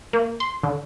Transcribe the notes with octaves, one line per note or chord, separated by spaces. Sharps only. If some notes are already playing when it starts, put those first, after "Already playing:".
A#3
C6
D3